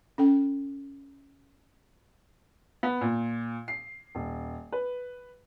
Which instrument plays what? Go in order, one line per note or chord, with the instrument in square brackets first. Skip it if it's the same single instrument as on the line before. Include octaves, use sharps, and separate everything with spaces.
[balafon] C#4 A4 G5
[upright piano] B3
A#2
C7
D#1
B4